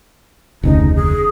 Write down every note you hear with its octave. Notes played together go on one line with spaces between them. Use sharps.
F1 D2 C#3 D#4
G#4